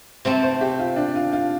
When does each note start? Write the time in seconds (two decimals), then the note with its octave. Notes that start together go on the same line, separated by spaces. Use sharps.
0.25 C3 A3 C4 A4 C5
0.43 C5
0.61 G4
0.79 F4
0.96 D4
1.15 F4
1.33 F4